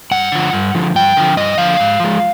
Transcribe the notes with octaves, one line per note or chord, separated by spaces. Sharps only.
G2 F#5
D3 F3
G2
D3 F3
G2 G5
D3 F3
G2 D#5
D3 F3 F5
G#2
F3 G#3